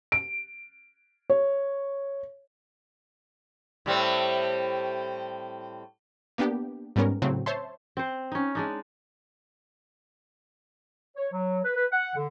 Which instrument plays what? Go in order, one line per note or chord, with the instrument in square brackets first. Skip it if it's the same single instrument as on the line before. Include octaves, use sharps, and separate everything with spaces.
[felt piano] D7
C#5
[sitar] A2 G3 C4
[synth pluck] A#3 B3 D4 G4
G#2 G3 B3 C#4 A#4
A2 C#3 F#3 C4
C5 C#5 E5 A5 C6
[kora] C4 C5
C#4 D#4
G#3 D4 D#4
[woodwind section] C#5
F#3
B4
B4
F#5
D3